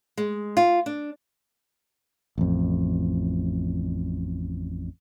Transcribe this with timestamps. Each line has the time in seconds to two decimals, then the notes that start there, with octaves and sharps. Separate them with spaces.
0.17 G#3
0.57 F4
0.86 D4
2.38 A1 F2